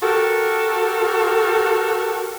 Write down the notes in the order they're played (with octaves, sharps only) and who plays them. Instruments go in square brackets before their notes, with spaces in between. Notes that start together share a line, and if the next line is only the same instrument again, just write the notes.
[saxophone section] F#4 G4 A4 A#4